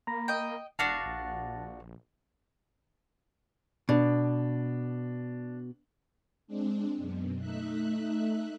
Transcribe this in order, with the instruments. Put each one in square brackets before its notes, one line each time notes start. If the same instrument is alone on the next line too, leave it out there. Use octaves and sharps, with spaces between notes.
[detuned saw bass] A#3 [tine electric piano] A#5 B5 A#6
[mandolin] D#5 G5
[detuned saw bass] E1 [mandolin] D4 F#4 F5 [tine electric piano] A5 A6 A#6
[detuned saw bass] A#1
[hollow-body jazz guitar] B2 [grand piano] D4
[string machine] G#3 C4 D4
F#2 B2
A3 D#4 E5 F#6